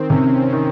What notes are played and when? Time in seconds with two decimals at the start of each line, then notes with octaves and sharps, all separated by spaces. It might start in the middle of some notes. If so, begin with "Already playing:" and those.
Already playing: D#3 C4
0.09 C3 C#4
0.53 D#3